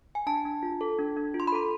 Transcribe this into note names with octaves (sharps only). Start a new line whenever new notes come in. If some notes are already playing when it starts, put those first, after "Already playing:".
G#5
D4 A5
D4
F4
A4
D4
D4
F4
C6
B5
A4 A#5